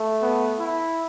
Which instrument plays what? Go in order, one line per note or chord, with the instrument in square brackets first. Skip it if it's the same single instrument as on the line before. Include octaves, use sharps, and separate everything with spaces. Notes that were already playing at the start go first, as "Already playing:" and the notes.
Already playing: [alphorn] A3
[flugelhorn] B3
E4